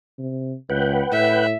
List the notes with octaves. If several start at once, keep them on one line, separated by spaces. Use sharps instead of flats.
C3
C#2 B4 F#5 G5
A2 E5